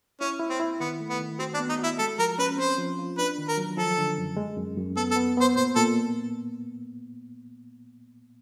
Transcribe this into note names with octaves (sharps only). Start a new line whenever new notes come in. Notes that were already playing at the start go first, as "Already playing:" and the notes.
C#4 E4
E4
C4
E4
D#3 B3
A3
B3
D#3
C4 F#4
D4
B3
D#4
E4 F#4
G#3 A4
F3 A#4
C#4 B4
C4 C5
F3
F4
D4 B4
D#3
A#4
F#3
F3 A4
D3
F#2
G#3
F#2
F#2
B3 A4
A4
B3
B3 C5
A#2 C5
A#2 A4